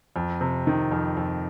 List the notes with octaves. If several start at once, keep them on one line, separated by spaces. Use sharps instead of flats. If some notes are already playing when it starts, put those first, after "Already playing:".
F2
C3
D#3
F2
F2